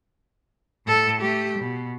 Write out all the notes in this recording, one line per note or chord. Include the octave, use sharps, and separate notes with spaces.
A2 A4
A3 G4
B2